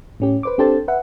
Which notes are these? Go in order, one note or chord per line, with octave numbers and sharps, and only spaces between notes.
A2 C#4 G4
B4 C5 D6
C4 D4 G4 A4 C5 A5
B4 E5 F#5